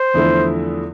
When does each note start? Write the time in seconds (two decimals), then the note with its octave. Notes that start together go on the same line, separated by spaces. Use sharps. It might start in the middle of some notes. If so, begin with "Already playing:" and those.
Already playing: C5
0.14 E2 D3 F3 A3 E4